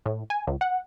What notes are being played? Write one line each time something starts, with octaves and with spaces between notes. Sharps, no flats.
A2
G#5
C#2
F#5